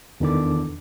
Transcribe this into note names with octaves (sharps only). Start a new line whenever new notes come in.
E2 D#3 E3 D4 A4 D6